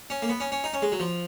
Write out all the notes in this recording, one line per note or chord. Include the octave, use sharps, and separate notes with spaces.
C#4
A#3
B3
C#4
C#4
D#4
C#4
G#3
F#3
F3